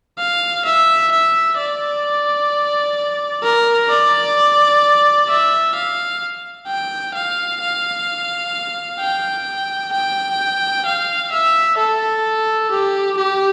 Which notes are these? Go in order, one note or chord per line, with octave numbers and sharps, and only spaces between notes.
F5
E5
E5
D5
A#4
D5
E5
F5
G5
F5
F5
G5
G5
F5
E5
A4
G4
G4